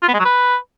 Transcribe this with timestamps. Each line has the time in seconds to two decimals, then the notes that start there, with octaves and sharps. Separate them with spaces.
0.02 F4
0.08 B3
0.14 G#3
0.19 F#3
0.25 B4